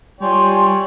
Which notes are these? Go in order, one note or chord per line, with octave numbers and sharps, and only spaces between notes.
G3 F4 C#5 D5 G5 G#5 C6